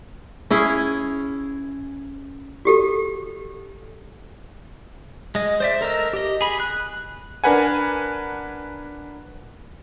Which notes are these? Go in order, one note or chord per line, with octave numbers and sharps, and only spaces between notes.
C#4 E4 G#4
F#4 G4 A4
G#3 D#5
C5 D5 E5
A4 A#4 D#5 E6
G4 D#5
G#4 B5
F#6
D4 A#4 B4 F#5 G#5